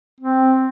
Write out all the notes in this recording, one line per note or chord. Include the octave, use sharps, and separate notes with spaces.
C4